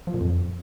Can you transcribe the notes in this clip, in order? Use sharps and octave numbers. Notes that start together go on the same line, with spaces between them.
F3
A#2
F2